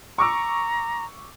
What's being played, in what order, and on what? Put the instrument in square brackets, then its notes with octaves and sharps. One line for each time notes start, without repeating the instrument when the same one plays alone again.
[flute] A#5 [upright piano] C#6 D6 E6